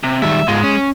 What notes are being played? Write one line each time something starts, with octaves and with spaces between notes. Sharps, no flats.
C3
D#3 G3 G#3 E5
G#2 G#3 F4
C#4